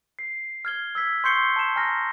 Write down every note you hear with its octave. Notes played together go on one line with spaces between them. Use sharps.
C7
F6 G#6 G7
E6 G#6 B6
C6 C#6 G6 C7 C#7 G7
A5 E7
G#5 A#5 F6 A#6